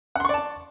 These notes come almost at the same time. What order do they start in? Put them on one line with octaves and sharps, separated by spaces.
F#5 C6 C#6 D5 A5